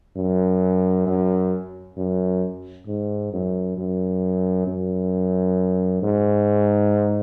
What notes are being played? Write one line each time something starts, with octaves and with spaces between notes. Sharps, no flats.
F#2
F#2
F#2
G#2
F#2
F#2
F#2
G#2